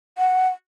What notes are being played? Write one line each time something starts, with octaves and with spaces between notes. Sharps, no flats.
F#5